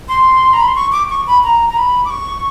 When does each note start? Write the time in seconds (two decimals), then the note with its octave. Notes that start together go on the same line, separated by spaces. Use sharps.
0.08 C6
0.53 A#5
0.61 B5
0.68 C6
0.75 C#6
0.92 D6
1.10 C#6
1.27 B5
1.44 A#5
1.69 A#5
1.77 B5
2.05 D6
2.10 C#6